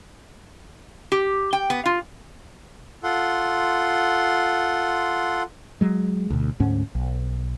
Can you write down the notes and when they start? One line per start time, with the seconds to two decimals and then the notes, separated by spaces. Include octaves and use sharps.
1.12 G4
1.53 G5
1.70 B3
1.86 F4
3.04 F4 A4 F#5 C6
5.81 F#3 G#3
6.30 D2 B2
6.60 D2 G#2 C#4
6.95 B1